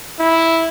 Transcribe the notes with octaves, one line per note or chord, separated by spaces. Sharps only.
E4